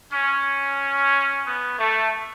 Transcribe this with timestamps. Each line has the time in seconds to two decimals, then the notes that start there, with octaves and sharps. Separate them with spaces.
0.12 C#4
1.46 B3
1.78 A3